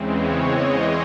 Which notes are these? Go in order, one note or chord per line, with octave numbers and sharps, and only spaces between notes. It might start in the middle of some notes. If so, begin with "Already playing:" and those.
Already playing: E2 C#3 E3 G#3 C4
C#5
D#5